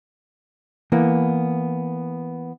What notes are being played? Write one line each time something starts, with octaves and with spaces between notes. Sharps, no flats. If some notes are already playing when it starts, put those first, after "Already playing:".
E3 A#3 B3